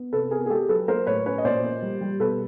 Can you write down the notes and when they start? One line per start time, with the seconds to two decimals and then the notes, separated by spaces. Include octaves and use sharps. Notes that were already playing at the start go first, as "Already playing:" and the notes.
Already playing: B3
0.13 C3 A4 B4
0.31 B3 G#4 A#4
0.46 G#4
0.50 G#3 G4 A4
0.69 F#3 A4 B4
0.88 A#3 A#4 C5
1.07 A2 B4 C#5
1.26 C#4 B4 C#5
1.38 D#5
1.44 A#2 C5 D5
1.64 A#3
1.82 G3
2.01 G3
2.20 B2 A4 B4